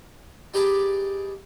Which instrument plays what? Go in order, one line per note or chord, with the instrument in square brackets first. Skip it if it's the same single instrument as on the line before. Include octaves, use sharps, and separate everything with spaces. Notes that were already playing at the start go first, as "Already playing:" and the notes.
[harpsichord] D#4 G4 G#4 B4 A5 D6